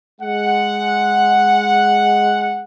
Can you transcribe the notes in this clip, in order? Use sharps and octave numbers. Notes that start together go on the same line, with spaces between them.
G#3 F#5